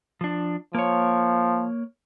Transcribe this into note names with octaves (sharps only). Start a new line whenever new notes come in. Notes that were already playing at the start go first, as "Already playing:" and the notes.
F3 D4
F3 A#3 C#5